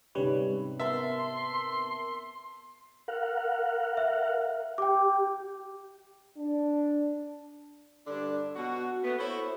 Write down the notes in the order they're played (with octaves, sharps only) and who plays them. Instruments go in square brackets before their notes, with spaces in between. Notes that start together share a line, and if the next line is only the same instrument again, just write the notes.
[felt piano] G#2 C3 C#4 [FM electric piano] G3 B4 C#5
[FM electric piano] B3 A#4 A5 [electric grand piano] E5 [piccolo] C6
[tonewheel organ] A#4 F5 F#5
[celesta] E5
[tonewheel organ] G4 [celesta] G5 D6
[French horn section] D4
[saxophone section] G2 D3 D4
B2 F#4
A3 B3
E4 F#4 A4 C5 C#5